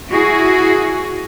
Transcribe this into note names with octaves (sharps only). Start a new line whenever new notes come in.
E4 F#4 G#4